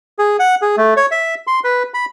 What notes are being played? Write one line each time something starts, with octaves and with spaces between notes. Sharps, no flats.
G#4
F#5
G#4
A3
C#5
E5
C6
B4
B5